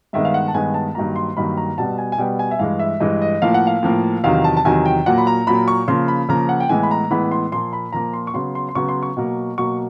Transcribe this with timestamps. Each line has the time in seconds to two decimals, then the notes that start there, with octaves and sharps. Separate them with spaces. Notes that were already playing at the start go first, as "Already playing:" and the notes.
0.13 G2 D#3 G#3 B3 E5
0.25 F5
0.34 F#5
0.48 A5
0.54 G2 D#3 G#3 B3 G#5
0.74 A5
0.95 G2 D#3 F#3 A#3 A#5
1.16 C6
1.37 G2 D#3 F#3 A#3 B5
1.57 A#5
1.78 B2 G3 B3 A5
1.98 G#5
2.12 G#5
2.18 B2 G3 B3 G5
2.39 G#5
2.51 E5
2.59 G2 E3 G#3 F5
2.79 E5
3.00 G2 E3 G#3 D#5
3.22 D#5
3.42 A2 F3 A#3 F5
3.54 F#5
3.67 F5
3.83 A2 F3 A#3
4.24 E2 C3 D#3 F#3 F5
4.44 A5
4.57 A5
4.65 E2 C3 D#3 F#3 G#5
4.86 G5
5.06 A#2 F#3 A#3 F#5
5.18 B5
5.27 A#5
5.47 A#2 F#3 A#3 B5
5.68 C#6
5.88 C#3 F3 A#3 C6
6.08 B5
6.29 C#3 F3 A#3 A#5
6.49 F#5
6.60 G5
6.69 A2 E3 G#3 B3 G#5
6.83 B5
6.91 A#5
7.11 A2 E3 G#3 B3 B5
7.31 C6
7.52 A#2 F3 A#3 C6
7.73 B5
7.93 A#2 F3 A#3 A#5
8.13 C6
8.27 C#6
8.34 C#3 F#3 B3 C6
8.55 C6
8.69 C6
8.75 C#3 F#3 B3 C#6
8.89 C6
9.03 C#6
9.17 B2 F#3 A#3
9.58 B2 F#3 A#3 C#6